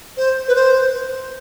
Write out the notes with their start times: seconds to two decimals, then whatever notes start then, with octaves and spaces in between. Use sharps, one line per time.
0.17 C5
0.48 B4
0.55 C5